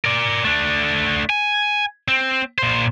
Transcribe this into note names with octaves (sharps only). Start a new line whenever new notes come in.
A#4 D5
A3 D4
G#5
C4
A#2 C5